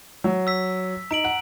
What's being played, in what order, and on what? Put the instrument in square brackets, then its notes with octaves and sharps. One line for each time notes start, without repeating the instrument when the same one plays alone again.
[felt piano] F#3
[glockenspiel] E6 B6
[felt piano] D#4 [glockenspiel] A#5 D7 F#7
[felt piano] F#5